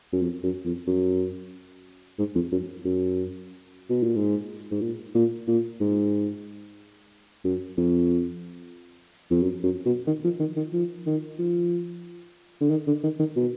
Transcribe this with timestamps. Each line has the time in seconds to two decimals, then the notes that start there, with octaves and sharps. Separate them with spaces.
0.13 F#2
0.22 F2
0.43 F#2
0.65 F2
0.88 F#2
2.19 G#2
2.35 F2
2.52 F#2
2.85 F#2
3.90 B2
4.03 A#2
4.16 G#2
4.71 G#2
4.81 A#2
5.15 A#2
5.48 A#2
5.80 G#2
7.44 F#2
7.77 F2
9.31 F2
9.42 F#2
9.63 F#2
9.85 B2
10.07 D#3
10.24 F3
10.40 D#3
10.57 D#3
10.73 F3
11.06 D#3
11.39 F3
12.61 D3
12.70 D#3
12.87 D3
13.03 D#3
13.19 D#3
13.36 B2